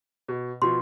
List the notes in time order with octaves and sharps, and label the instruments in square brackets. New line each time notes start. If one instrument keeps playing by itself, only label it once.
[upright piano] B2
[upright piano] B2 F3 [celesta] C6